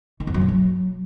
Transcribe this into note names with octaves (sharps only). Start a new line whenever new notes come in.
D#3
F2
F#2
B2
F#3